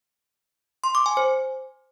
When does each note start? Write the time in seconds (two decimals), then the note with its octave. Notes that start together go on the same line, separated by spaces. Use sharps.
0.84 C6
0.95 D6
1.06 G#5
1.17 C5